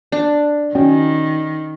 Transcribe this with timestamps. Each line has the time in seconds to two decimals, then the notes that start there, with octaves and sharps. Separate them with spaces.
0.12 D4
0.75 D#3 C#4 F#4 G5